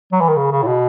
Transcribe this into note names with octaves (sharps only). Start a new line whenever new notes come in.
F#3
E3
D#3
C#3
C#3
A2
B2